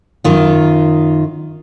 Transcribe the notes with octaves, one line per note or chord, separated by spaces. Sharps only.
F#2 D#3 F4